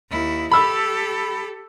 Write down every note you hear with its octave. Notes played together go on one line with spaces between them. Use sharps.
D#2 E4
G4 A4 B5 E6